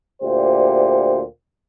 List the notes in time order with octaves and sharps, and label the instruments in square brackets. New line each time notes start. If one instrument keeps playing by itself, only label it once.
[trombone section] D2 A#2 G4 C5